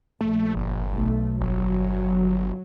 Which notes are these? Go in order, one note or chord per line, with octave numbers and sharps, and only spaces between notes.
A#1 A3
G1
B1 A3
G1 F#3